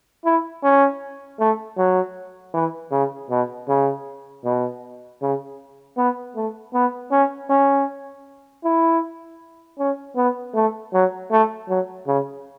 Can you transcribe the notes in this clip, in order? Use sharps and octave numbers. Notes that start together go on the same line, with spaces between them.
E4
C#4
A3
F#3
E3
C#3
B2
C#3
B2
C#3
B3
A3
B3
C#4
C#4
E4
C#4
B3
A3
F#3
A3
F#3
C#3